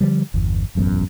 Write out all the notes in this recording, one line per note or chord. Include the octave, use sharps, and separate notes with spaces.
D3 F3 G3
G1 E2
E1 A1 F#2 B3